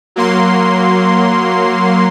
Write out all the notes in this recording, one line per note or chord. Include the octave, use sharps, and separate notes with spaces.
F#3 A#3 C6